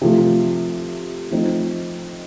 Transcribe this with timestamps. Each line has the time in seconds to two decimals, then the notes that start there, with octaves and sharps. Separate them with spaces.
0.02 C3 F3 A3
1.31 F3 A3 C4 D#4